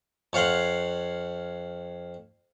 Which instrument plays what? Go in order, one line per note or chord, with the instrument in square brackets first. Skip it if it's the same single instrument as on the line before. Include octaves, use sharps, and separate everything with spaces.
[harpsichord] F2 C#5 F5 F#5 C6